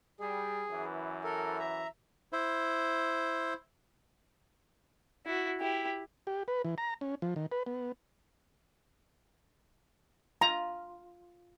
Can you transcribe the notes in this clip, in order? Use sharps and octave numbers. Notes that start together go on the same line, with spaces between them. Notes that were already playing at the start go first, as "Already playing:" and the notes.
G3 G#4
F#2 E3
A4 A#4
E5 A#5
E4 C5
E4 F#4
E4 G4
G4
B4
E3
A#5
C#4
F3
D#3
B4
B3
F4 A#5